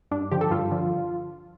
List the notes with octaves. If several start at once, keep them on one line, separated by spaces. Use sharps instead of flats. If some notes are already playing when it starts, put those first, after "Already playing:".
G2 D4
D3 F3 G4
A4
G2 F4
D3 F3